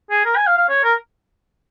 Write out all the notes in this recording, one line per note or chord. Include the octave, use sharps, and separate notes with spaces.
G#4
A#4
G#5
F5
F5
C#5
A#4